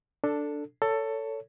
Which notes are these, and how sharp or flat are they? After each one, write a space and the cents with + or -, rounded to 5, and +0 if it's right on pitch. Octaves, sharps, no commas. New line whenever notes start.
D4 +0 A4 +10
A4 +15 C#5 +20